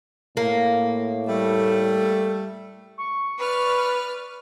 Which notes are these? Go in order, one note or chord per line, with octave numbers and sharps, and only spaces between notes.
A2 A#3
G3 A3
C#6
B4 D5 F6